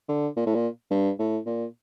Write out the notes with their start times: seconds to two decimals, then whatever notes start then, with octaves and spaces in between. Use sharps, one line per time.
0.09 D3
0.37 A#2
0.46 A2
0.55 A#2
0.91 G2
1.19 A2
1.46 A#2